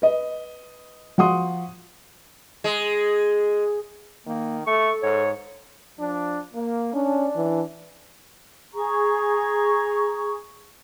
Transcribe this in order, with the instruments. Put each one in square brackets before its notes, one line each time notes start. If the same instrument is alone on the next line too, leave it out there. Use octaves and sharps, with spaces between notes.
[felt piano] B4 D#5
F3 F#4 F#5 C6 D#6
[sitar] G#3
[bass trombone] D#3 [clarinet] A#3
[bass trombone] A3 [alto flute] A4 [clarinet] C#6
[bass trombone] G#2 [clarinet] C#5
[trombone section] F3 D4
A#3
[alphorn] C#4 [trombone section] D4
[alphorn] E3
[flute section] G#4 A#5 C#6